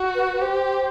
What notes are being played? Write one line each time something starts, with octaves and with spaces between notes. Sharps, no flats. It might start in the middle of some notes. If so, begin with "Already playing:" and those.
Already playing: F#4
B4
G4 C5